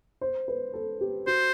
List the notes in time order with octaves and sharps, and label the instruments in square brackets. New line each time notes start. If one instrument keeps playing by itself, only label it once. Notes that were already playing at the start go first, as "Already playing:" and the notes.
[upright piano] C5
B4
A4
G4
[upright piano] F#4 [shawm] C5